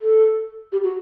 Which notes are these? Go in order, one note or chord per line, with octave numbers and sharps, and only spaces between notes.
A4
G4
F#4